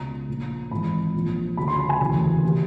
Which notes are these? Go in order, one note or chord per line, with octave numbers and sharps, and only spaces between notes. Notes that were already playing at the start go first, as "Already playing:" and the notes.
Already playing: C#2 B2 A#5
A#1 A#2 F3
G#1 G#2 E3 B5
A#1 A#2 F3
D2 C#3 F3 B5
C6
B5
G#5
E1 D2 C#3 E3
C3 D#3